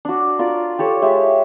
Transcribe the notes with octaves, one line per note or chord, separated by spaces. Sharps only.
D4 F#4
F4 A#4 D5
G4 A4 C#5
G#3 G4 E5